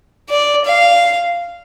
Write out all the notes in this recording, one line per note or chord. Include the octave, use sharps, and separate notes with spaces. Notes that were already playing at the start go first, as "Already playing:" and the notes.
D5
F5